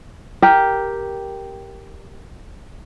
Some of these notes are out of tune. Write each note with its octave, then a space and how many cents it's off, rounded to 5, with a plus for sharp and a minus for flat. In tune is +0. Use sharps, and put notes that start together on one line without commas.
G4 +0 A#4 +0